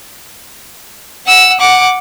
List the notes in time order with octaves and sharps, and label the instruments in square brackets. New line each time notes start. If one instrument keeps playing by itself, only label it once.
[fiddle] F#5 E6
F#5 D6